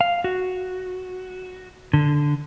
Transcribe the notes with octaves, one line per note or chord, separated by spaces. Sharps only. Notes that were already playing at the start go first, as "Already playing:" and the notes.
F5
F#4
D3